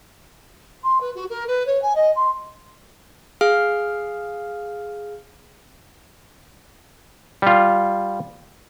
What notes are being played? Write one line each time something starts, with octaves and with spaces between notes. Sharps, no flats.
C6
B4
F#4
A#4
B4
C#5
G#5
D#5
C6
G#4 F5 F6
G3 F4